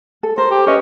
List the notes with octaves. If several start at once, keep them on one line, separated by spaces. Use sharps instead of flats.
A4
A#4 C5
G4
C#4 B4 D#5